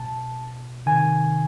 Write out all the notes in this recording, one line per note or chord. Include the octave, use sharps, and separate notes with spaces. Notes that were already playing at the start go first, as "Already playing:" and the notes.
Already playing: B2 A5
C3 D#3 G#5